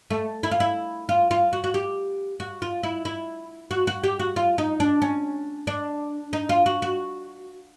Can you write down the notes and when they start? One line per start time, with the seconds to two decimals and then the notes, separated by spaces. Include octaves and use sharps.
0.10 A3
0.43 E4
0.51 F4
0.60 E4
1.09 F4
1.31 F4
1.53 F#4
1.64 F#4
1.74 G4
2.40 F#4
2.62 F4
2.83 E4
3.05 E4
3.71 F#4
3.87 F#4
4.04 G4
4.19 F#4
4.36 F4
4.58 D#4
4.80 D4
5.02 C#4
5.67 D4
6.33 D#4
6.49 F4
6.66 F#4
6.82 F#4